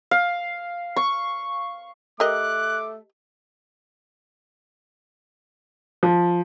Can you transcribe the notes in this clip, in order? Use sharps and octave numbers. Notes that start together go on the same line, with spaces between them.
F5
C#6
A3 G4 A#4 D#5 D6 F#6
F3